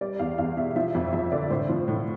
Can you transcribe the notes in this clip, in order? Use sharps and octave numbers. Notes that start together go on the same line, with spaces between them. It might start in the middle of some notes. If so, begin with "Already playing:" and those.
G3 D5
E2 F5
E2 F5
B2 E5
F3 E5
F2 E5
F2 E5
D3 D5
A2 C5
F3
A2